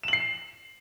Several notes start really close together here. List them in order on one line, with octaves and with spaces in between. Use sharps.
E7 F#7 C7